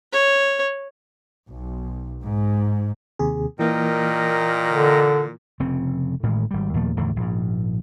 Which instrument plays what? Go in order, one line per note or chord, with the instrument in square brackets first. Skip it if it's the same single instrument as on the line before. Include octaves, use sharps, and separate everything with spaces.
[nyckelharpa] C#5
[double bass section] B1
G#2
[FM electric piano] D#2 C3 G#4
[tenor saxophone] A#2 [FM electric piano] E3 A#3 [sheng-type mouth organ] A#4 D#5 G5
[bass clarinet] D3
[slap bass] F1 C#3 C4
A1 A2 D#3 G#3
G#1 G3
D#2 A#2 F3 A3
E2 A2 D3 D#3
A#1 G#2